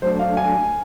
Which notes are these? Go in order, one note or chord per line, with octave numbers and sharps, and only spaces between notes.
F#3 A3 D4 C5
F5
G#5